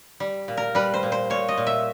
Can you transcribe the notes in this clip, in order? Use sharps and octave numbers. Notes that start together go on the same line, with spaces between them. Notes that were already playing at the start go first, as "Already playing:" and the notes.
G3
A#2
A#4
G3 B4
C5
A#2
C5
A#2 C#5
D#5
A#2
E5